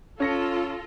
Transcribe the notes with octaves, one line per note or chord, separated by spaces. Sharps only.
C#4 F4 A4 A#6 C#7